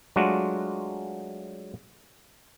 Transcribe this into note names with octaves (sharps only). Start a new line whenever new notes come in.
F#3 G#3 A3 D4 F4 F#4